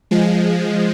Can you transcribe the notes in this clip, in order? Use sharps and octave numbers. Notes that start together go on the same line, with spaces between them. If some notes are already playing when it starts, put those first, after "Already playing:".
F3 G#3